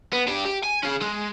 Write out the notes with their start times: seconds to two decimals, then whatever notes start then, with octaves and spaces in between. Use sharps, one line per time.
0.13 B3
0.28 D4 G4
0.45 G4
0.63 G#5
0.83 C#4 G#4
1.01 G#3